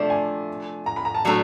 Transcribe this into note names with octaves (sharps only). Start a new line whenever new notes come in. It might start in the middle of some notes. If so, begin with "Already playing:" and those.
Already playing: C3 F3 A3 D4
G#5
A#5
B5
A#5
A5
A2 F#3 A3 D4